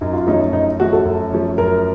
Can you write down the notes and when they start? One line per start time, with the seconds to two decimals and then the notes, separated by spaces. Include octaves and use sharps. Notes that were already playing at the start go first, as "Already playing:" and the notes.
0.01 F#2 D#4
0.13 F4
0.27 F3 A3 C#4 D#4
0.53 F#2 D#4
0.80 F3 A3 C#4 F#4
0.93 A4
1.05 F#2
1.31 F3 A3 C#4
1.58 F#2 A#4